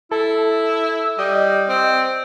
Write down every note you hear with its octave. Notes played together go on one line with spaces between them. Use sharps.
E4 A4
G3 D#5
C4